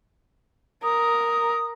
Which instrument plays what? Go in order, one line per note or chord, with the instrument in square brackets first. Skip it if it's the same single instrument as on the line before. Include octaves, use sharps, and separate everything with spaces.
[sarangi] A#4 [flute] D#6